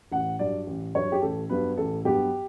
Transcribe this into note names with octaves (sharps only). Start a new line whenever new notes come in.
A1 F#5
G2 F#3 D5
A1
G2 F#3 C#5
G4
A1 A4
G2 F#3 B3 B4
A1 A4
G2 F#3 B3 G4